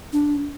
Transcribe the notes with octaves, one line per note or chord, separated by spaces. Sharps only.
D4